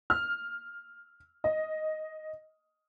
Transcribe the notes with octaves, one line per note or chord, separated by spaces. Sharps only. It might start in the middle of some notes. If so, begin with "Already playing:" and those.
F6
D#5